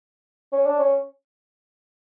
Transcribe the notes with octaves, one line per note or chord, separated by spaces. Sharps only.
C#4
D4
C#4